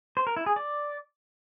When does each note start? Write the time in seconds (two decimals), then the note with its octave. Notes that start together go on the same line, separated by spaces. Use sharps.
0.17 C5
0.27 A#4
0.37 E4
0.46 G#4
0.56 D5